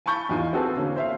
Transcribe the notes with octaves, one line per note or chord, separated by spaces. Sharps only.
G#5 A5 B5 C#6 G6 A6
E2 D#4 F4 G#5
C4 F#4 G#4 A4 B4
D3 A#3 C#4
C5 E5 F5